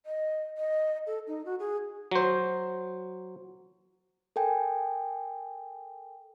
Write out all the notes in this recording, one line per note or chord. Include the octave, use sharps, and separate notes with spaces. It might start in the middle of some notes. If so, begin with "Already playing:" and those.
D#5
D#5
A4
D#4
F#4
G#4
F#3 C5
A4 A#4 G5 G#5